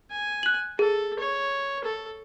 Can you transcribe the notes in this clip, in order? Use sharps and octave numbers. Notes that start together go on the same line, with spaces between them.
G#5
F#6 F#7
G#4 A4
C#5
A4